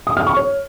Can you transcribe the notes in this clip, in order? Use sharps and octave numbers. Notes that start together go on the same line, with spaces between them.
D#6
F6
C#6
C#5